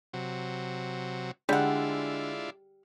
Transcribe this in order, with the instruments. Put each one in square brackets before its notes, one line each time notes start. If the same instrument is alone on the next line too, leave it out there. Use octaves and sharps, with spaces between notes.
[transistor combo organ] C3 F#3
[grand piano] D3 [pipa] G3 F#5 [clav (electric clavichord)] G#3 [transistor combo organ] D4 E4 F4